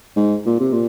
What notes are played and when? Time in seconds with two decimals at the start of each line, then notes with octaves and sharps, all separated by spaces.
0.16 G#2
0.46 A#2
0.60 C3
0.73 A#2